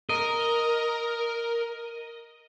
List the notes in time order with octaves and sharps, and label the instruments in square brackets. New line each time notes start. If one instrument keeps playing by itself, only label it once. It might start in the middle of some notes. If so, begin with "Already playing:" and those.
[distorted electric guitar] A#4 [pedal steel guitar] D#5